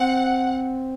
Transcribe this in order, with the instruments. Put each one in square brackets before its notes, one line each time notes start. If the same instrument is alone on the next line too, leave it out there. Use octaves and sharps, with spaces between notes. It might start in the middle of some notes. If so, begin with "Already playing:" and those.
Already playing: [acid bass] C4 [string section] F#5